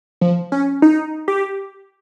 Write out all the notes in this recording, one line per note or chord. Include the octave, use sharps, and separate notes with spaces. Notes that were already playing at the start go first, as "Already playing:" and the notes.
F3
C#4
D#4
G4